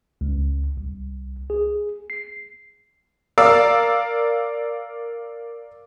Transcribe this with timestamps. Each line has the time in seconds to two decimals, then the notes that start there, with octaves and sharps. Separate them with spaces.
0.21 C#2
0.77 C2
1.50 G#4
2.10 C7
3.38 A#4 D5 F5 E6